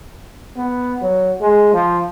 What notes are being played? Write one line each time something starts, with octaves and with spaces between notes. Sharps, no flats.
B3
F#3
G#3
F3